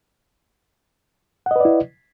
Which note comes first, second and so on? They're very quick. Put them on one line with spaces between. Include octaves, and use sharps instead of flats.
F#5 D#5 B4 D5 E4